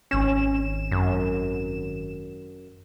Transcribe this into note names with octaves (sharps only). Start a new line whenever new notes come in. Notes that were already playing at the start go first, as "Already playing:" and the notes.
G#1 C#4 E7
F#2